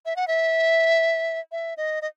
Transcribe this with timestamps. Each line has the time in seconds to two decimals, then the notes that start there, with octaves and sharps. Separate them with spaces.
0.06 E5
0.16 F#5
0.28 E5
1.52 E5
1.77 D#5
2.02 D#5